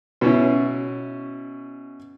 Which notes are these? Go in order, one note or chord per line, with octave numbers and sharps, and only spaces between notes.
B2 C#4 E4